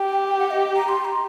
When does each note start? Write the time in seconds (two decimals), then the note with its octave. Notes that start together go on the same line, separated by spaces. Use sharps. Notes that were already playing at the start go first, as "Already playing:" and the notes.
Already playing: G4 G5
0.38 F#5
0.51 D#5
0.76 A#5
0.88 C6
1.05 A#5